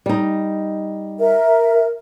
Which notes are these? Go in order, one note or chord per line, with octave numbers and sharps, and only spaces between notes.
G3 D#4
A#4 E5